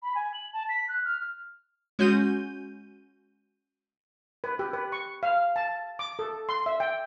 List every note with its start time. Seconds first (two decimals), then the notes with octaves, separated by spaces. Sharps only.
0.02 B5
0.15 G#5
0.33 F#7
0.53 A5
0.69 B6
0.88 F#6
1.04 F6
1.99 G#3 C#4 F#4 G6 D#7
4.44 B4
4.59 G4
4.73 B4
4.92 C#6
5.23 F5
5.56 A5
5.99 D6
6.19 A4
6.49 C6
6.66 E5
6.80 G5